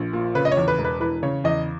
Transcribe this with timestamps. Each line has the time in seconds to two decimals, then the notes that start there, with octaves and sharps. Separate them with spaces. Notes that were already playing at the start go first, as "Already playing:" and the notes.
Already playing: A#1
0.13 A#2
0.35 C#3 B4
0.45 D#5
0.52 C#5
0.57 E2
0.68 B4
0.78 E1
0.84 B4
1.00 E3 B4
1.23 C#3 C#5
1.44 E2 D#5